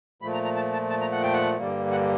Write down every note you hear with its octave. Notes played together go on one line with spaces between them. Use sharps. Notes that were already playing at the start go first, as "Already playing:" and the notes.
A#2 F3 A3 B5
A#5
A#5
A5
A5
A5
A#5
F#5
G5
F#5
G2 D3 G3 A#3
F#5